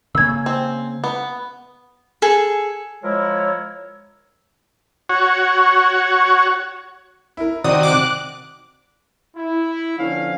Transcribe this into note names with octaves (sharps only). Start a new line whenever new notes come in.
C#3 A#3 C#4 E6 G#6
C4
B3
G#4 A4
F3 G#3 E4 A#4 C#5
F#4 C#5
E4 A#4
C3 D#3 F#4 D5 G5 D#6
D6 F#6
E4
D3 F3 B3 C#4 F5